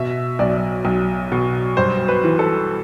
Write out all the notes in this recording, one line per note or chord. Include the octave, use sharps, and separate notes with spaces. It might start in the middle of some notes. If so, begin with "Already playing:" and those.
Already playing: B2 E5
B1 D5
B1
B2
G2 C5
B4
E3
A4